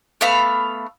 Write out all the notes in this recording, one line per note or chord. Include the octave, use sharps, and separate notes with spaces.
A3 B3 F5 B5